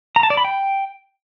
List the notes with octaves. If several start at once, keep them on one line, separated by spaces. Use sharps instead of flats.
A#5
A5
D5
B5
G5